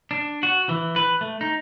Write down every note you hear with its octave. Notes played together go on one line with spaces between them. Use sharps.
D4
F#4
E3
B4
A3
D#4